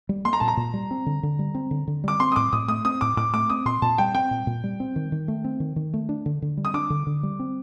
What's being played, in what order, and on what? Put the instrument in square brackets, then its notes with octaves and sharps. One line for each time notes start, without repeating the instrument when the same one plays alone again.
[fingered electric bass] G3
[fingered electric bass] A#3 [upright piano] C6
[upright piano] A#5
[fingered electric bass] A#2 [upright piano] A5
[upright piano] A#5
[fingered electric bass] A#2
G3
C4
D3
D3
G3
C4
D3
D3
[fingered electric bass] G3 [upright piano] D6
[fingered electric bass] C4 [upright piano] C6
[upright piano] D#6
[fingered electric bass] A2 [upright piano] D6
[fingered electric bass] A2 [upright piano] D#6
[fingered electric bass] A3 [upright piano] D#6
[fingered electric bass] C4 [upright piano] D#6
[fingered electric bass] A2 [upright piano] D6
[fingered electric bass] A2 [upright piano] D6
[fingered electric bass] A3 [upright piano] D6
[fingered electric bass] C4 [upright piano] D#6
[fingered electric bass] A#2 [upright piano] C6
[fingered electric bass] A#2 [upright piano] A5
[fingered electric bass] G3 [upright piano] G5
[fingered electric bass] C4 [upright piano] G5
[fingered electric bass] A#2
A#2
G3
C4
D#3
D#3
A3
C4
D#3
D#3
A3
D4
D3
D3
G3
[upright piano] D#6
[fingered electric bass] D4 [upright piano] D6
[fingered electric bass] D3
D3
G3
C4